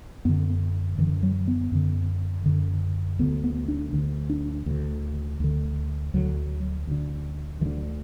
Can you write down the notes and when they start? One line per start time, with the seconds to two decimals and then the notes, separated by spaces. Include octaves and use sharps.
0.25 F#2 D3 B3
0.98 F#2 D3 E3
1.23 F#3
1.48 B3
1.72 F#2 D3
2.46 F#2 D3
3.19 D2 D3 B3
3.44 B3
3.68 D4
3.93 D2 D3
4.30 D4
4.66 D2 D3
5.40 D2 D3
6.14 D2 D3 F#3
6.87 D2 D3
7.61 D2 E3
7.66 D3